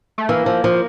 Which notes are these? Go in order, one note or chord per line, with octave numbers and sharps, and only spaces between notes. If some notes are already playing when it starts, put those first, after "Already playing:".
A3
E3 A#3
F3
F3